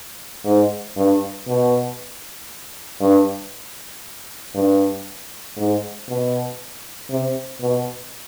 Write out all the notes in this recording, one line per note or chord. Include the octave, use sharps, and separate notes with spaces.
G#2
G2
B2
G2
G2
G#2
B2
C3
B2